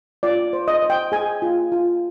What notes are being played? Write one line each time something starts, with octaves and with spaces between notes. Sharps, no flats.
F4 D5
C5
D#5
C5
G5
G#4 G#5
F4
F4